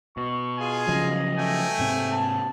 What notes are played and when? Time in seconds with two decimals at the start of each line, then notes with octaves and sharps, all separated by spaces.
0.17 B2 C#6
0.58 F4 G#4 G#5
0.88 C#3 F3 F#3 D#5
1.38 A3 G5 G#5
1.79 G#2 C3 C4
2.12 A5